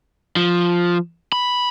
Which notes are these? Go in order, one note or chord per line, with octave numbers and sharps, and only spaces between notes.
F3
B5